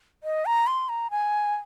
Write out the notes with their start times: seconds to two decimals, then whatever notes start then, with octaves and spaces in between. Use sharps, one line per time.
0.23 D#5
0.46 A#5
0.67 C6
0.89 A#5
1.11 G#5